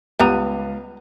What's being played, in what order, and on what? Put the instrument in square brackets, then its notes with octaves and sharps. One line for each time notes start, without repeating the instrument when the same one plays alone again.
[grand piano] C#2 D#7 [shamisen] G3 B3 A#5